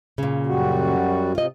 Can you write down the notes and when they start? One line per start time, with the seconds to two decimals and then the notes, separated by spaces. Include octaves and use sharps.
0.18 A#2 C#3
0.46 F#2 G3 F#4
1.35 C3 F4 D#5